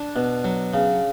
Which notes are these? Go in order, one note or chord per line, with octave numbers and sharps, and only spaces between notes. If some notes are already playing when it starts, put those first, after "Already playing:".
Already playing: D4
B2
F#3
C#3